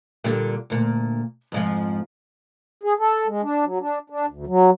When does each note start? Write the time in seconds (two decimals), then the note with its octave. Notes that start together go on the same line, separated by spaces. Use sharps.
0.24 A#2 D3 G3
0.70 D2 A#2
1.52 F2 G#2 F3
2.83 G#4
2.99 A4
3.27 G#3
3.42 D4
3.64 F#3
3.80 D4
4.10 D4
4.29 D2
4.47 F#3